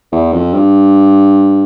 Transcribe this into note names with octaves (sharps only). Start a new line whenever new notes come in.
E2
F2
G2